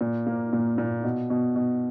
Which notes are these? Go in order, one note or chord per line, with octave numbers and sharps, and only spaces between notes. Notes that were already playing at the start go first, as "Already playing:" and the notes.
A#2
A#3
A#2
A#2
B2
B2
B2